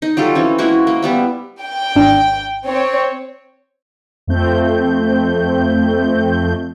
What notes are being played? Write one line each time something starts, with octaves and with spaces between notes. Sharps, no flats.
D#4
F#3 G3 F4 A4
E3 C4 C#4
G#3 A#3 E4 F#4
A#3
G3 B3 E5
G5
G#1 D4
C4 C#5
F2 F3 A3 C4 G6